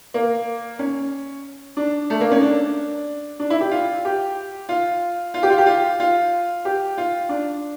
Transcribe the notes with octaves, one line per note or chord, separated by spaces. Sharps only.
A#3
C#4
D4
A3
A#3
C#4
D4
D4
E4
G4
F4
G4
F4
F4
G4
F4
G4
F4
F4
G4
F4
D4